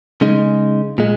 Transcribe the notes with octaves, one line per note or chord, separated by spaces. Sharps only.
C#3 G#3 D#4
A#2 G#3